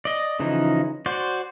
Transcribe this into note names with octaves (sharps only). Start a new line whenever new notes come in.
D5 D#5
C#3 E3 F3 D#4
F#4 C5 D5